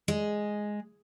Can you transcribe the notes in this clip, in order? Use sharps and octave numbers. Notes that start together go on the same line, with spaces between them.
G#3